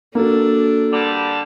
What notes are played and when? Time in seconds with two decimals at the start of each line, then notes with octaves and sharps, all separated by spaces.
0.15 A#3 D4 F#4 A4
0.93 D3 G3 A5